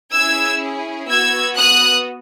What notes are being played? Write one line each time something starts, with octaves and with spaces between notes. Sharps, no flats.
C#4 E4 G#4 E6 G#6
B3 F#4 E6 G#6
D#6 F#6